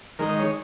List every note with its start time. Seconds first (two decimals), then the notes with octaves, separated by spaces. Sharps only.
0.19 D#3 G#3 D#4 A#4
0.29 D#5
0.39 C#5